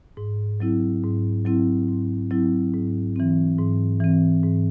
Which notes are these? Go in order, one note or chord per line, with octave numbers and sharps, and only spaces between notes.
G#2
F#3 C4 E4
G#2
F#3 C4 E4
G#2
F#3 C4 E4
G#2
E3 C4
G#2
E3 C4
G#2